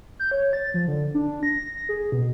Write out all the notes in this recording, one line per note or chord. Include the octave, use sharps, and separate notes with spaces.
G6
C#5
A6
F3
D3
D4
A#6
G#4
B2